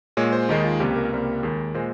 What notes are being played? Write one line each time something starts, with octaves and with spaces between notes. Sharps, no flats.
A#2 G#3 C#5
C5
D#2 D#3 G#3 D#4
F4
C#2 C3 G3 A#3 G4
A#4
C#2 C3 G3 A#3
D#2 D#3 G#3
A#2 G#3 C5